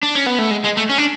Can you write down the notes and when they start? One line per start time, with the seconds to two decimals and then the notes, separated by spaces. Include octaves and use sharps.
0.03 D4
0.15 C#4
0.27 B3
0.39 A3
0.51 G#3
0.64 G#3
0.77 A3
0.89 C#4
0.98 D4